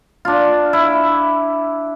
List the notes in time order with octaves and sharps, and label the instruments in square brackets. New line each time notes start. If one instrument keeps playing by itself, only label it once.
[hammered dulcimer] D4 F4
E4